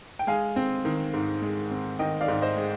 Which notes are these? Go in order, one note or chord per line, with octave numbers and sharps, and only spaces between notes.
G5
G#3 F5 G#5
C4
D#3
G#2
G#3
C4
D#3 D#5 G5
D5 F5
G#2
C5 D#5
G#3